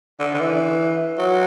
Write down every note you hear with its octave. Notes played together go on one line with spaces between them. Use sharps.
D3
D3
E3
F#3